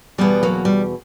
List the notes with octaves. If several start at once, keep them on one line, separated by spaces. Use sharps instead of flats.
E2 B2 G3 B3
F#3 A#3
G3